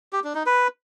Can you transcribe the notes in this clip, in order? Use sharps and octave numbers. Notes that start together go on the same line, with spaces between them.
G4
D4
D#4
B4